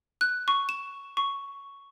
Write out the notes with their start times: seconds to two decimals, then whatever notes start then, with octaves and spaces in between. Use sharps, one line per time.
0.21 F#6
0.48 C#6
0.69 E7
1.17 C#6